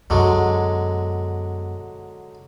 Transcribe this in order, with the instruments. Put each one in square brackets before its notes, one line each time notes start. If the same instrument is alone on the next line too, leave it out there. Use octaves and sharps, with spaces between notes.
[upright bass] F#2 B2 [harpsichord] D3 F#3 G#3